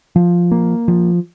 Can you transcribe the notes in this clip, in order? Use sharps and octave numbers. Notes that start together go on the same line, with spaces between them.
F3
A#3
F3